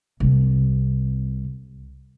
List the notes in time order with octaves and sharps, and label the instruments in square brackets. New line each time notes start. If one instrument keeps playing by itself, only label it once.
[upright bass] C2 C3